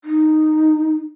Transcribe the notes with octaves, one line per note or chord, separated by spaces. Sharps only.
D#4